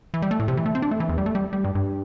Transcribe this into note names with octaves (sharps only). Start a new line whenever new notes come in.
E3
G3
A3
A2
C3
E3
A3
C4
D4
A3
E3
E2
G3
A3
G3
G3
G2
G2